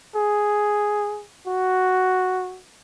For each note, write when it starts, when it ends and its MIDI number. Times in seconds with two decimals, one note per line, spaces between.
0.15 1.25 68
1.47 2.60 66